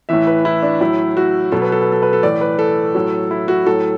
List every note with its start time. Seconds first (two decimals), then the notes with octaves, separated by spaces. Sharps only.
0.09 A2 E3 E5
0.27 B4
0.45 E4
0.63 D4
0.81 A2 F#3 E4
1.17 F#4
1.52 B2 F#3 A4
1.62 B4
1.72 A4
1.82 B4
1.92 A4
2.02 B4
2.13 A4
2.23 A2 E3 D5
2.41 B4
2.59 A4
2.95 A2 F#3
3.31 E4
3.48 F#4
3.66 A2 F#3 A4